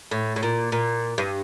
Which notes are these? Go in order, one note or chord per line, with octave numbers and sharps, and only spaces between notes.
A2
A2
A#2
A#2
G2